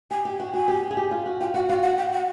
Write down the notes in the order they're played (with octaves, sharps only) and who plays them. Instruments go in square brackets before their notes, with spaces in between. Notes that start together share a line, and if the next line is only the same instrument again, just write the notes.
[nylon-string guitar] G4 [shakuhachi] G#5
[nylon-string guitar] G4
[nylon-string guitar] F#4 [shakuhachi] G5
[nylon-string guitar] F#4 [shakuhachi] G#5
[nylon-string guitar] G4
G#4
G4
F4
F#4
[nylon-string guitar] F4 [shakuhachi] G5
[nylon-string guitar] F#4 [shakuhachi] F#5
[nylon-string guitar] F#4 [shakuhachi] F5
[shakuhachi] F#5
G5
F#5